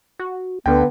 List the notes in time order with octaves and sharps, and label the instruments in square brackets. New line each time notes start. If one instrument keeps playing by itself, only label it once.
[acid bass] F#4
[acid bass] D2 [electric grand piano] D3 G5 [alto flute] B3